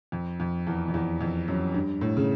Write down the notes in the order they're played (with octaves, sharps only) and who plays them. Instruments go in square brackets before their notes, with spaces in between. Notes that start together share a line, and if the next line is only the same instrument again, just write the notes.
[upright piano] F2
F2
E2
F2
E2
F2
F#2
G2
A2
C#3